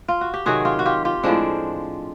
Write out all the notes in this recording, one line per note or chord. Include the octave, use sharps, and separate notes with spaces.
F4
F#4
G4
C3 D#3 F#3 F#4 G#4
F4 G4
F#4
F4 G4
F4 G4
A2 F3 G#3 C4 D4